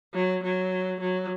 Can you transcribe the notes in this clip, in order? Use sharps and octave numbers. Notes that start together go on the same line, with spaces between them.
F#3
F#3
F#3